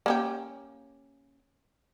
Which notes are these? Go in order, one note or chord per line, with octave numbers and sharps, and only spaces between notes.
A#3 C#4 G4